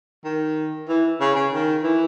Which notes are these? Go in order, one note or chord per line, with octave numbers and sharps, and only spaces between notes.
D#3
E3
C#3
C#3
D#3
E3